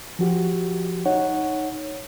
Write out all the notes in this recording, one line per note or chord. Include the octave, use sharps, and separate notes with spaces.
F3 F#4 G4
D#4 C#5 F#5